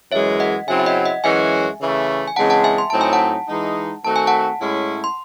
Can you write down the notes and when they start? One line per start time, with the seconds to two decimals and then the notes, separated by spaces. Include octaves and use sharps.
0.12 F#2 E3 G#3 C#5 E5
0.40 D#5 F#5
0.67 C#3 F#3 C4 E4 E5 G#5
0.79 E5
0.86 D#5 F#5
1.05 D#5 F#5
1.24 F#2 E3 G#3 C#4 F#4 E5 G#5
1.80 C#3 E3 A3
2.27 G#5
2.36 C#3 E3 G#3 C4 F#5 A5
2.50 F#5 A5
2.64 E5 G#5
2.78 C6
2.90 A2 F#3 C4 D#4 A5
3.01 G#5
3.13 F#5 A5
3.48 E3 G#3 D#4
4.04 D#3 A3 C4 F#4 A5
4.16 G#5
4.27 F#5 A5
4.60 A2 G#3 C#4 E4
5.04 C6